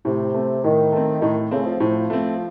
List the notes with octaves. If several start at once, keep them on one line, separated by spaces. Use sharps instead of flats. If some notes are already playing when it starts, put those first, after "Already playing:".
A2 C3
A3 C4
A2 D#3
A3 C4
A2 D#3
C#3 A3 C4
F3
A2 F3
A3 C4